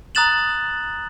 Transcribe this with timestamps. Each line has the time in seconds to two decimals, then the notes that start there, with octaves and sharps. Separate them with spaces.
0.15 A#5 D#6 F#6 A6 E7 F#7